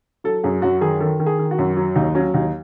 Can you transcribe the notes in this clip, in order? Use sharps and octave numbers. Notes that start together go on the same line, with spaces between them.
F#3 A4
F#2 G#4
F#2 F#4
D#3 G#4
D#3 A4
D#3
G#4
D#3
F#4
F#2
F#3
D#2 D#4
F#3 C#4
D#2 D#4